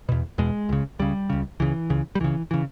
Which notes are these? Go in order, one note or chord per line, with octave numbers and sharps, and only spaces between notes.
E2 B2
E2 B2 G#3
C#2 C#3
C#2 C#3 G3
C#2 C#3
C#2 C#3 E3
C#2 C#3
G3
C#2 C#3 E3
C#3 E3